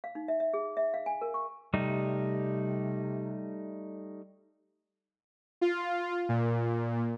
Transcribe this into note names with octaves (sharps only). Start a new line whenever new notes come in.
F5
D#4
E5
E5
G#4
E5
F5
G#5
A#4
C#6
C3 G3 A3 D#4
F4
A#2